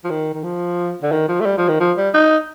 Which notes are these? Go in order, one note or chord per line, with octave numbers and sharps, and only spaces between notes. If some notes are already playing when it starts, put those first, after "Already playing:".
F3
D#3
D#3
F3
D3
D#3
F3
A3
G3
F3
D#3
F3
G3
D#4